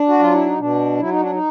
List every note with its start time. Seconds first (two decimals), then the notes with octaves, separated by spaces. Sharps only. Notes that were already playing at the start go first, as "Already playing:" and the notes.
Already playing: D4
0.08 F#4
0.19 F#3 F4
0.34 E4
0.46 D#4
0.59 B2 D4
0.99 F#3 E4
1.10 D#4
1.20 D4
1.32 D#4